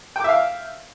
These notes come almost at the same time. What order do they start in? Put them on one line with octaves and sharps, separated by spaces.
G5 D6 E5 F5